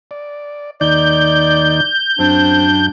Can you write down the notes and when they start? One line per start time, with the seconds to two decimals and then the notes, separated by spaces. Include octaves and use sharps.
0.11 D5
0.81 D#2 D#3 D#4 D5 G6
2.19 F#2 C4 D4